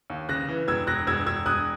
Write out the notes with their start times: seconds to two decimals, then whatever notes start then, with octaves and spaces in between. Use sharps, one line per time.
0.10 D#2
0.29 C#3 F#6 A#6
0.49 E3
0.68 E1 E6 G#6
0.87 E1 F#6 A#6
1.07 E1 E6 G#6
1.26 E1 E6 G#6
1.46 E1 D#6 F#6